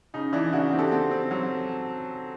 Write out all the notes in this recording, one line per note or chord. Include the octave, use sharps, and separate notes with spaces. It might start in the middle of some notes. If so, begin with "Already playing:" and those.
C#3 D#4
E3 D4 E4
C#3 E4 F#4
C4
G4 A4
C4
C4
F#3